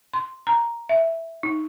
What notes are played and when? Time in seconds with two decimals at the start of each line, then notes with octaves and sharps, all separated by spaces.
0.14 C6
0.47 A#5
0.89 E5
1.43 D#4